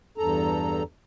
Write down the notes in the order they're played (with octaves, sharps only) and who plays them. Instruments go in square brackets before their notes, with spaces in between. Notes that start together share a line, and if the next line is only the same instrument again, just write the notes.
[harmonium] E2 G2 A4 A#5